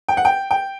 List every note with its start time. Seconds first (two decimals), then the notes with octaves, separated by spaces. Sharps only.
0.08 G5
0.17 F#5
0.25 G5
0.51 G5